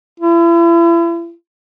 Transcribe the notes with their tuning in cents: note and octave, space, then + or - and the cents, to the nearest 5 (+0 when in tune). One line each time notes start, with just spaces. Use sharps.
E4 +40